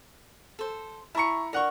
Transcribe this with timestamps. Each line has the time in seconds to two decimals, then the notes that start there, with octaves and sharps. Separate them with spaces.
0.59 A4 C5
1.15 E4 A5 A#5 C#6 C#7
1.53 D4 A#4 F#5 C#6